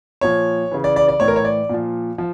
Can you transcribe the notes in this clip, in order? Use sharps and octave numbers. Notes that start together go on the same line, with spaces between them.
A#2 F3 C#5
C#3 E3
D5
D5
D5
A2 E3 C#5
A#4
C#5
D5
A#2 F3
F3